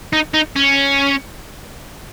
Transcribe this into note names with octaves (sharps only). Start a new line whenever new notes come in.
D#4
D#4
C#4